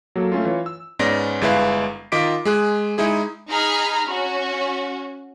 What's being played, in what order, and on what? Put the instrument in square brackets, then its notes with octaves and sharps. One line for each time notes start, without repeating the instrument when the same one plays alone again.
[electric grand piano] F#3 A#3 A4
A3 C#4 F4
E3 F4 C#5
E6
G#2 B3 C#4 D5 A#6
G1 G#3 E4 B4 F5 C7
D#3 F4 D#5 D6 B6 D7
G#3 G#4 F#6
G#3 D#4 E4 G#4
[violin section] D#4 G#4 A#5 B5 F6
C#4 F#4